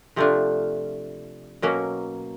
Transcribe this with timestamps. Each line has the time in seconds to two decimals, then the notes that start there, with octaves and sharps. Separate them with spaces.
0.16 C3 F3 A3 D4 F4
1.62 B2 F#3 A#3 C#4